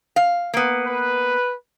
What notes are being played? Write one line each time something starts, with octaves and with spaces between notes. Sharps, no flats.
F5
A#3 B3
B4